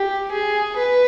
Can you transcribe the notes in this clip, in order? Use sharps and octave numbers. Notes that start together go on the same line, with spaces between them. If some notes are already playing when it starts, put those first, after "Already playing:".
Already playing: G4
G#4
B4